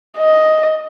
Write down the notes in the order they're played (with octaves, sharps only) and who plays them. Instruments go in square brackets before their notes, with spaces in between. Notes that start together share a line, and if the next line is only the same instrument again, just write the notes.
[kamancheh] D#5